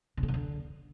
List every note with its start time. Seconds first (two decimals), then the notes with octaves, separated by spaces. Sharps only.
0.17 D3
0.23 C#3
0.28 D#3
0.34 D3